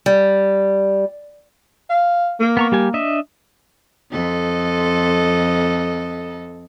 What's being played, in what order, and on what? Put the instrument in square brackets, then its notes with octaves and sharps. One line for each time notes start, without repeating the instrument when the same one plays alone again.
[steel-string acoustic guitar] G3
[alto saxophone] F5
A#3
[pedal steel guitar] B3 A#5 C#6
G3 G4 G#5
D4 D#5 E5
[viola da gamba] F2 A4 D#5